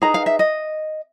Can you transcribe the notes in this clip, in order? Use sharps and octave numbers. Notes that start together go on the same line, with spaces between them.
D#4 G#4 B4 A#5
F5
E5
D#5